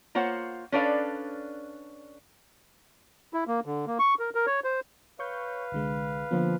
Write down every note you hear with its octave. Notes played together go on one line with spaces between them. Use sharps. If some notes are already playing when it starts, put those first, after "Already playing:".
A#3 F4 C5 C#5 F#5
C#4 D4 A4 B4 D5 F5
E4
A#3
D3
A#3
C#6
A#4
A#4
C#5
C5
B4 C#5 F5 C#6 G6
C2 D3 G#3
D3 F3 A#3 B3